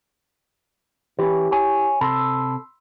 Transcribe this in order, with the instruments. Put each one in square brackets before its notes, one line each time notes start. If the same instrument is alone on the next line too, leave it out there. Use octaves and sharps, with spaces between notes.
[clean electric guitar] E3 C#4 [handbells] E4 G4
[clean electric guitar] C#5 G#5
[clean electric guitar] C3 A4 [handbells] B5 C6 E6